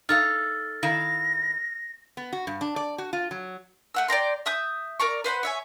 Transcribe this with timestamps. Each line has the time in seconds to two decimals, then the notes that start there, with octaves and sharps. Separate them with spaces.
0.09 D#4 A4 F5 F6 A6
0.83 D#3 E4 F5 A#6
2.17 B3
2.33 F#4
2.47 G2
2.61 D4
2.76 D5
2.98 F#4
3.13 F4
3.31 F#3
3.94 A3 F#5 E6
4.08 D5 G5 A#5 C6
4.46 E5 D#6 G6
5.00 A#4 D5 A#5 C#6
5.24 B4 C5 F#5 B5
5.43 C#5 E5 G#5